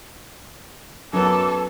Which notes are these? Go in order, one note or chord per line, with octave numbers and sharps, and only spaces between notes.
F#2 F#3 B3 A4 D6